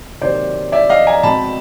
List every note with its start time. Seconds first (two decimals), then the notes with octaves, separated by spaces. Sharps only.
0.21 C3 D#3 F#3 A#3 C5 D5
0.72 D5 E5
0.89 D#5 F5
1.07 G#5 A#5
1.23 B2 G#3 C4 A5 B5